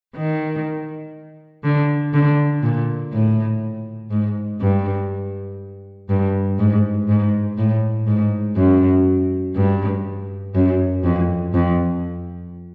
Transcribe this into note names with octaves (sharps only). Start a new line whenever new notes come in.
D#3
D3
D3
A#2
A2
G#2
G2
G2
G#2
G#2
A2
G#2
F#2
G2
F#2
F2
F2